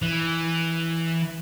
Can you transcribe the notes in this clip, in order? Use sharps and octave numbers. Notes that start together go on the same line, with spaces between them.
E3